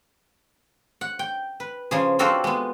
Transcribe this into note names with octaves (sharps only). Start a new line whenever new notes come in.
F#5
G5
B4
C#3 F3 G#4
C4 F4 F#4 A4 C5 D5
G#3 B3